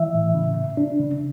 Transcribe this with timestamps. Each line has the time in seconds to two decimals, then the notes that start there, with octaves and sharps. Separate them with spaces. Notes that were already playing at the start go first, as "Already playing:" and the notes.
Already playing: E3 E5
0.14 A2
0.35 C#3
0.57 C#3
0.77 D4
1.00 C#3